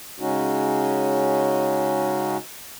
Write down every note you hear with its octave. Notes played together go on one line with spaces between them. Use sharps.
C#3 G#3 C#4 D#4 F#4